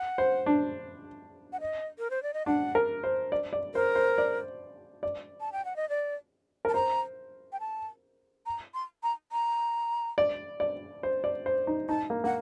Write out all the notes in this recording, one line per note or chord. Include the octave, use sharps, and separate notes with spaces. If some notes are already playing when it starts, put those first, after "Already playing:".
Already playing: F#5
C5
D4
F#5
D#5
A#4
C5
D5
D#5
D4 F#5
A#4
C5
D5
D5
A#4 C5
C5
D5
D5
A5
G5
F#5
D#5
D5
A#4 A5
C5 A#5
G5
A5
A#5
C6
A#5
A#5
D5
D5
C5
D5
C5
D#4
D#4 A5
A#3
A#3 F#5